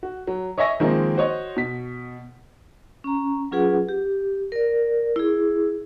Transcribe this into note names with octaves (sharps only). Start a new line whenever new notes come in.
F#4
F#3
C#5 D#5 E5 G#5 C#6 A#6
D#3 F3 G#3 A#3 C4 D#4
F#4 C5 C#5 D#5
B2 B6
C#4 A#5
F#3 C#4 F4 G#4 B4 F#5
G4
A#4 D5
E4 G#4